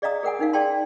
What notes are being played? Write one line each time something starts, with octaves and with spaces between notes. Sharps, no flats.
G#4 D5 D#5 F5 A#5 D#6
G#4 A#4 F#5 G#5
C#4 D#4 A#4 F5
G#4 D5 F5 G5 A5 C6